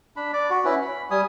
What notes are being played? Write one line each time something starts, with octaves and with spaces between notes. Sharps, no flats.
D4 B5
D5
F#4
C#4 E4 B4
B5
G3 G#5 D#6